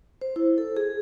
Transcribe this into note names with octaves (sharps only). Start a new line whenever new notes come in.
C5
E4
A4
G#4